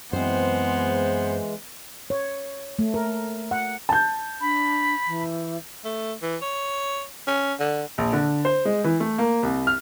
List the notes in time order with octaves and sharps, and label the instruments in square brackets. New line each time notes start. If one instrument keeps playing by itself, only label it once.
[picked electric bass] F#2 C4 [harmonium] E3 G#3 [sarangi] B3 [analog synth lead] C5
[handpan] C#5
A3
A#4
F#5
[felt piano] A5 G6
[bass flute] D4 [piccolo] B5
[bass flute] E3
[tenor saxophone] A3
E3
C#5
C#4
D3
[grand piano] A#1
D3
C5
G#3
E3
A3
A#3
C2
F6